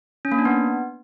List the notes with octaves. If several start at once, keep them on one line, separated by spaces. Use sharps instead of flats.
C#4
A#3
D4
B3